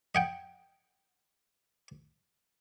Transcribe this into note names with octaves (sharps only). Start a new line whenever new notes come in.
D#5 F#5 G5